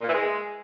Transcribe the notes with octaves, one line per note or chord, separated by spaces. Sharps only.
A#2
E3
G#3